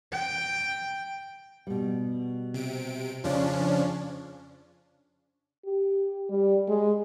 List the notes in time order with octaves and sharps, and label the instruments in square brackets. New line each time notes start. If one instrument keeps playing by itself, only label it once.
[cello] G5
[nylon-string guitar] B2 G3
[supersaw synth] C3 D7
[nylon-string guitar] F2 C#3 [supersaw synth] F3 C#4 D4
[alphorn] G4
G3
G#3